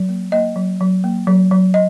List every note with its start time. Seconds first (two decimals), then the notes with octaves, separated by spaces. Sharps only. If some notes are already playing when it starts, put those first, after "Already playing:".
Already playing: F#3
0.09 A#3
0.32 A#3 D#5
0.56 F#3
0.80 F#3
1.04 A#3
1.27 F#3
1.51 F#3
1.74 D#5